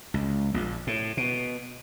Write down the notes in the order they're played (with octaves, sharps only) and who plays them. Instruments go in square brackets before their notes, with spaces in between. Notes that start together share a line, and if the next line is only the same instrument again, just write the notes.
[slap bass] C#2
A#1
A2
B2